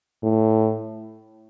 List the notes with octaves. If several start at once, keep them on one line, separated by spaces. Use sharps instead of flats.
A2